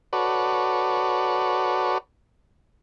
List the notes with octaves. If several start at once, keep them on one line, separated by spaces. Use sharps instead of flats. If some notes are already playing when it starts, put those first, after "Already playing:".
F#4 A4 B4 C#5 D5